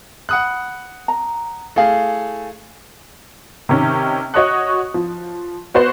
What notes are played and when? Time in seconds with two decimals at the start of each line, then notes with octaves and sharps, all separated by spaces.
0.29 F#5 B5 D#6 F#6
1.08 A#5
1.76 A3 E4 G#4 F5
3.69 C3 D#3 C#4
4.34 F#4 C#5 D#5 C#6 D#6 F#6
4.94 F3
5.74 B3 F#4 B4 C5